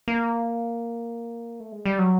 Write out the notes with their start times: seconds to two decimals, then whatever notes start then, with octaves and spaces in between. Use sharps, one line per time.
0.08 A#3
1.60 A3
1.72 G#3
1.85 G3
1.99 F#3